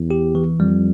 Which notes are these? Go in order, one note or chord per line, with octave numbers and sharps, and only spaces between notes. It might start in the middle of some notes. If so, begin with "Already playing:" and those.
Already playing: E2
G4
E3
F2 G3